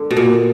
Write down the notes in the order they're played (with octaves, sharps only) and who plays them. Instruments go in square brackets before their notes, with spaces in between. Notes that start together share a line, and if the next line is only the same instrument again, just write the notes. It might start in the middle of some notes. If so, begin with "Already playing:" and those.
Already playing: [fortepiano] D3
[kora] B2
A#2